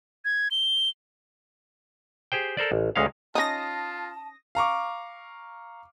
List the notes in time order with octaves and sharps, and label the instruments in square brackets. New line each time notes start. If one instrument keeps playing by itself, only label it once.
[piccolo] G#6
G7
[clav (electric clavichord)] G4 G#4 C5 G5
A4 A#4 C5 D5
A1
D2 G#3 C#4 F5
[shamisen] C#4 D#4 [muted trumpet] F4 [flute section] A5 [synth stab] D#6 A#6
[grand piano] F5 A#5 C#6 D6